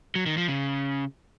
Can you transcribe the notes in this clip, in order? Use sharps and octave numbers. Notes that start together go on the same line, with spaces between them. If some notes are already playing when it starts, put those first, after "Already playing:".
F#3
D#3
F3
C#3